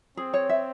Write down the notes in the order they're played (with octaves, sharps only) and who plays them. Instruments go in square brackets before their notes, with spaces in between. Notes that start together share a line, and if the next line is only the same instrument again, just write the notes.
[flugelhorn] C4 [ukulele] G#4
[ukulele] C#5
E5